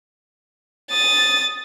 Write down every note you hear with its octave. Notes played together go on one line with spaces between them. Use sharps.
D#6 A6